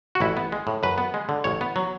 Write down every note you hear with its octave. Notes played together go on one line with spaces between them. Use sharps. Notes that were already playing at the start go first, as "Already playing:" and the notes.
F#4
A1 E4
B3
G#3
A2
F#2 B4
B3
G#3
D3
A1 C#5
B3
F#3